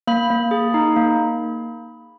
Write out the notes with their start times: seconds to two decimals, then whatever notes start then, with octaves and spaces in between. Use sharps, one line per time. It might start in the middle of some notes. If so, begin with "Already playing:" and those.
0.07 A#3 B5
0.30 A#3
0.51 G#4
0.74 D#4
0.96 A#3